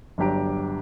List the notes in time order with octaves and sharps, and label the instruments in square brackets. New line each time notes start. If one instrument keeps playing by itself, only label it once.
[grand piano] G1 F#3 D4 G4 A#5 D7